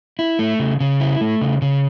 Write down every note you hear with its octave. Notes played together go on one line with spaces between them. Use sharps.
E4
A3
C#3
C#3
E4
A3
C#3
C#3